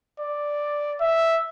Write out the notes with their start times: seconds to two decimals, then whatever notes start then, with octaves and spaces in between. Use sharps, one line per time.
0.19 D5
1.01 E5